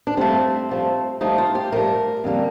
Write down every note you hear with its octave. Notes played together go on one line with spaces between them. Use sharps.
D4
G2 F3 A3 C4
G2 F3 A3
G2 F3 A3 D#4
F4
G4
G2 F3 A3 A#4
F2 D3 G3 A#3